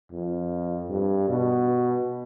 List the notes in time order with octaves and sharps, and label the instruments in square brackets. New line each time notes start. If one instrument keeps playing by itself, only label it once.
[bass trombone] F2
G2
B2